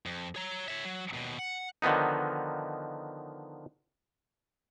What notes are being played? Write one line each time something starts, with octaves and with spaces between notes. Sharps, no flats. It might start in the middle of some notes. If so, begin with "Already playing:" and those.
F2
C#5 A#5
C#5 E5
F#3
D#2 B2
F#5
D3 D#3 F3 B3 D#4